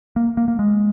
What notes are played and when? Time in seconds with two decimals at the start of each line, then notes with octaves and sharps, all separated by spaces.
0.16 A#3
0.37 A#3
0.48 A#3
0.59 G#3